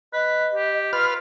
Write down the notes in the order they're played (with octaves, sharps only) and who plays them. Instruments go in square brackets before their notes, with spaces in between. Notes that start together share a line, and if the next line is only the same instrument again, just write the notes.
[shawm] B4 [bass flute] D#5
[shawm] G4
[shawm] F4 [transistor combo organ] B4 F6